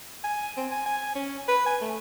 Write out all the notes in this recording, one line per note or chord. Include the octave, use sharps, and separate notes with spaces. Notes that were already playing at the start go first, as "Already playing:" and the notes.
G#5
C4
G#5
G#5
C#4
B4
G#5
A3